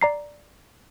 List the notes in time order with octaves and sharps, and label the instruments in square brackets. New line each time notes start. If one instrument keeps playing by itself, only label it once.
[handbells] D5 A#5 C7